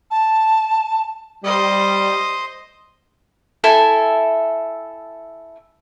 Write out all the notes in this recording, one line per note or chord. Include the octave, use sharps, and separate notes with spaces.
A5
G3 C5 D#5
E4 A4 E5 G#5